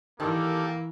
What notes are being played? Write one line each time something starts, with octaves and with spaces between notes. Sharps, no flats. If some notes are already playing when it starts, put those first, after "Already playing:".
D#3 E3 A#3 D4 G4 A4